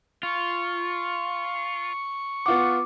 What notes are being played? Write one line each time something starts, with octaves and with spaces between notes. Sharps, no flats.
F4 C#6
B3 F4 F#5 D6